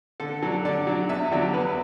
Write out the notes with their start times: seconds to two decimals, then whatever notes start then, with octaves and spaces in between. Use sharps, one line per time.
0.20 D3 A4
0.42 F#3 D4 A4
0.65 D3 D5
0.87 F#3 D4
1.09 E2 E5
1.31 D3 F#3 D4
1.54 E2 B4